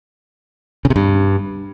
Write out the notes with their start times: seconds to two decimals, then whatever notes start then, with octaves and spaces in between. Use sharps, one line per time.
0.85 C#3
0.90 C3
0.96 G2